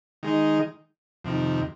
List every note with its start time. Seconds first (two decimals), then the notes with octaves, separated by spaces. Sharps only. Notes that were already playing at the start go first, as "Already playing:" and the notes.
0.23 D#3 G#3 D#4
1.24 F2 C3 D#3